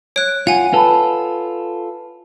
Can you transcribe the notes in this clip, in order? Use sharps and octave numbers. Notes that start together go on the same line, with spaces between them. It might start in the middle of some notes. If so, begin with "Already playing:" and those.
C#5 F#6 D7
F4 F#5 G#5
F4 A4 B4 A5 B5